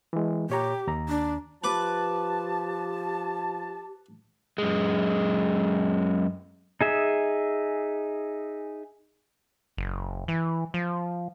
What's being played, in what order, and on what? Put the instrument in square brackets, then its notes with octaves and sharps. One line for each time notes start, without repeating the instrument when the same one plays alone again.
[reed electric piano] E3 G#3
[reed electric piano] A#2 C#5 A#5 [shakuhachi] G4
[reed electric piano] D#2 A#5
[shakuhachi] D4
[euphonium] F3 [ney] G4 [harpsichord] B4 D6 [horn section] A5
[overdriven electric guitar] F#2 G#3
[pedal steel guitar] D#4 G#4 E5
[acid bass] F#1
E3
F3